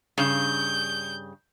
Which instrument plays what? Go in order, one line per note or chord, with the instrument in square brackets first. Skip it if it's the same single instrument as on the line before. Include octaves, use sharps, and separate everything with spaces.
[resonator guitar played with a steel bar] G2 C#3 [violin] G6